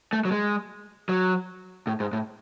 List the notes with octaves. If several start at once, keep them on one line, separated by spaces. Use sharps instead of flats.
A3
F#3
G#3
F#3
A2
G#2
A2